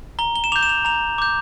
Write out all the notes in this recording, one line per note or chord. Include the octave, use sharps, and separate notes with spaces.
A#5 G7
G7
E7
D6 G6 F7
E7
F7
A#5 F7
D6 G6